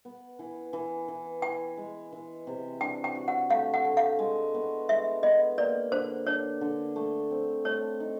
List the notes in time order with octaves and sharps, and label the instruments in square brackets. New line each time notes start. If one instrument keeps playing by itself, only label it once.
[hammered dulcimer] B3
E3
E3
E3
[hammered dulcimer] E3 [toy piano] G5
[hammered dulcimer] G#3
E3
C3
[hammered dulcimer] D4 [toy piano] G5
[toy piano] G5
[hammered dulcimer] F#4
[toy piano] F#5
[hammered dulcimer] A3 [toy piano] F5
[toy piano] F#5
[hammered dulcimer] A3
[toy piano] F5
[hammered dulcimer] G#3
B3
[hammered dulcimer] G#3 [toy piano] E5
[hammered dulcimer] B3 [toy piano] D#5
[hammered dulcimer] A#3 [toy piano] D5
[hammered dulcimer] D3 [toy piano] C5
[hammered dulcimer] D4 [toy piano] C#5
[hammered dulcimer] D3
A3
C4
[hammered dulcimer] A3 [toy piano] C#5
[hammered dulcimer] D#4